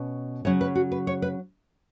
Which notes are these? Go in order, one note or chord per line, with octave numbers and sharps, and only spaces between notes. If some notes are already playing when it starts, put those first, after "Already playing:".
Already playing: B2 C#4
C#3 F#3 C#4 C#5
B4
F#4
B4
C#5
B4